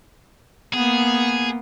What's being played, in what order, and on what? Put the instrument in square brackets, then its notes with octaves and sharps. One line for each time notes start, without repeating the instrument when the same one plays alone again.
[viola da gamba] A#3 B3 [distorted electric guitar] G#4